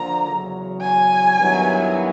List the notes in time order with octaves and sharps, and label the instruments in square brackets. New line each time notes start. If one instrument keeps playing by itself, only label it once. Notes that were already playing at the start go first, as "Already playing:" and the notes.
Already playing: [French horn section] D3 F3 A#3 [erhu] A#5
[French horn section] E2 C#3 F#3
[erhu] G#5
[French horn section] G2 D#3 F#3 B3 E4